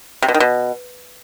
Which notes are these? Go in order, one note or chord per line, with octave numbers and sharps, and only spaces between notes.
C3
B2
D#3
B2